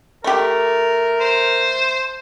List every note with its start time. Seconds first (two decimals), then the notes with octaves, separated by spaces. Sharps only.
0.24 A3 G4 A#4
1.21 C5